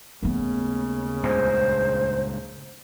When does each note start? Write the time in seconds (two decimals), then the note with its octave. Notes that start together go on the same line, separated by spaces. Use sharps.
0.23 D#2 C#3 A3 B3
1.23 C#2 G2 A#2 C5